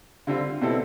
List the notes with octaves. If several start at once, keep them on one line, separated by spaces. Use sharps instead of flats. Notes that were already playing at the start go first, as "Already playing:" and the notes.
D3 G3 C4 F4
B2 G3 C4 E4 A4